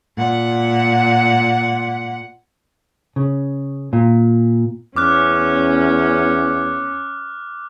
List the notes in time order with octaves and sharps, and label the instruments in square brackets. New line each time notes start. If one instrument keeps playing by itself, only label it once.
[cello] A#2 F#5
[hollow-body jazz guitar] C#3
A#2
[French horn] E2 [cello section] C#4 [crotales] D6 F6 F#6